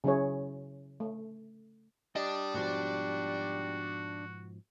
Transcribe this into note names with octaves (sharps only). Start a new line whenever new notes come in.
C#3 F#3 C#4 E4 G#4 C#5
A3
G3 D4 D#5 A5 D#6
G#2 B2 F3 F#4